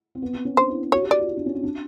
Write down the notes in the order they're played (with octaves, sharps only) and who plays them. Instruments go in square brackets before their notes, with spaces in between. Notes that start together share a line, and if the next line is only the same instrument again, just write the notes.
[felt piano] C4
B3
C4
C#4
[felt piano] D4 [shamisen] C5
[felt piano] E4
[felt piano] F#4 [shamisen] C#5
[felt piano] G4
[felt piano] F#4 [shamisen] D5
[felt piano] F4
E4
D4
C#4
C4
D4